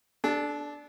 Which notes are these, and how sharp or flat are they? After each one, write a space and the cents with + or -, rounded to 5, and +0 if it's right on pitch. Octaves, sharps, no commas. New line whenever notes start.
D4 +0 A4 -30